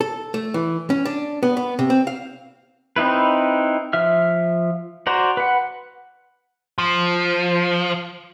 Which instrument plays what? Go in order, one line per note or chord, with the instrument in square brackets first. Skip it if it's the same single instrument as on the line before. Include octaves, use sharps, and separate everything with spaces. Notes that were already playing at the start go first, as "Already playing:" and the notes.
[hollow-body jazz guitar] A4
A3
E3
C#4
D4
B3
B3
C3
C4
F5
[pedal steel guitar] C4 D#4 E4 B4
F3 E5 F6
F#4 C5 D5 A#5
B4 F#5
[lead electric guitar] F3